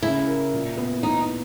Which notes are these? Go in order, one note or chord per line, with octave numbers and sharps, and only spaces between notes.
C#3 E4
A#4
A#2
B3
E3 D#4